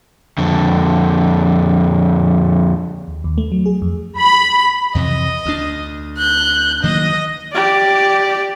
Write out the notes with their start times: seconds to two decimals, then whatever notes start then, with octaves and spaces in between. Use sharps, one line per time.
0.38 F2 D3
3.08 D#2
3.24 D#2
3.38 A3
3.52 F#3
3.66 G#4
3.82 F2
4.19 B5
4.95 F2 C3 E3 D#5
5.46 D2 D4
6.18 F#6 G6
6.83 D#3 F#3 A#3 D#5
7.53 G4 D5